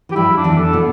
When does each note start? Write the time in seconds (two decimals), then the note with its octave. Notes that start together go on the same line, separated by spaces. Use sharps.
0.09 E3 G4
0.16 G2 G3 E4
0.37 D4
0.44 E2 E3
0.58 A4
0.73 B2